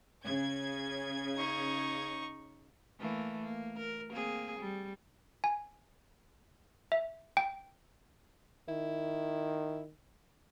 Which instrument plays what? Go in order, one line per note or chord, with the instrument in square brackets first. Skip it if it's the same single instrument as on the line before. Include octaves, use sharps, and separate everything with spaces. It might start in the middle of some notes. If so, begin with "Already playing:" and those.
[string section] C#3 G#6
[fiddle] D#4 C#6
[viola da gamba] E3 A3 A#3
A#3
A#4
A#3 C4 G#4
G3
[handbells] G#5
E5
G5
[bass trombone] D#3 [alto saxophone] E4